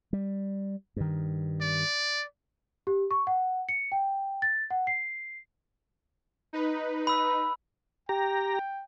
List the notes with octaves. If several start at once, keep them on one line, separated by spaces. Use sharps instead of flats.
G3
G2 D#3
D5
G4
C#6
F#5
C#7
G5
A6
F#5
C7
D#4 B4
B5 E6
G4 G5 A#5